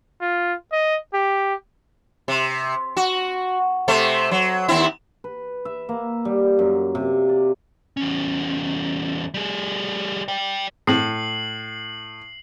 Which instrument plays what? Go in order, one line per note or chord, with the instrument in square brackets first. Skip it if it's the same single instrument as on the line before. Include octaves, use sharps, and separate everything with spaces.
[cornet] F4
D#5
G4
[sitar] C3
F#4
C3 A3 C5
F#3
D#2 C4 E4
[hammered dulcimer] B4
E5
A#3
G3
F#2
C3
D5
[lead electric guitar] E2 C#4
G3 G#4
D5 G5
[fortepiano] A2 [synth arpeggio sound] C4 G#4 [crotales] C7 F#7